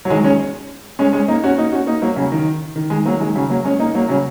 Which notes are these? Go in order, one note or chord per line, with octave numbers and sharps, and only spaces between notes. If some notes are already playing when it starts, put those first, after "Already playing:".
F#3
D#3 G#3
G#3 C#4
G#3 C#4
G#3 C#4
A#3 D#4
C#4 F#4
A#3 D#4
C#4 F#4
A#3 D#4
F#3 A#3
C#3 F#3
D#3
D#3
D#3 G#3
F#3 A#3
D#3 G#3
C#3 F#3
F#3 A#3
G#3 C#4
A#3 D#4
F#3 A#3
C#3 F#3